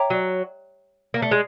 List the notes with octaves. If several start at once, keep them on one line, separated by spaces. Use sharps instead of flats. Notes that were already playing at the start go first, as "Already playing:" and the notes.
Already playing: C#5 E5 G5 A#5 D6
F#3
A#3
A3
G#3